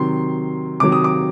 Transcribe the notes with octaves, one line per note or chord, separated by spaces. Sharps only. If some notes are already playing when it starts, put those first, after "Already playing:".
Already playing: C3 D#3 F#3 C6
C3 D#3 F#3 D6
D#6
D6